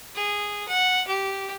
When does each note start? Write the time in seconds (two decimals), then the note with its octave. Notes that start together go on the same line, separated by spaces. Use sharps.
0.15 G#4
0.68 F#5
1.07 G4